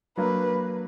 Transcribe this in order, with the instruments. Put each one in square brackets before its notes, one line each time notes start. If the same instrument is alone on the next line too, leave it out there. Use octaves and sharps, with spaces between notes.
[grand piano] F#3 A#3 D4 [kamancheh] B4